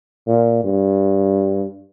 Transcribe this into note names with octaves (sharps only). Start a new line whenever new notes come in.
A#2
G2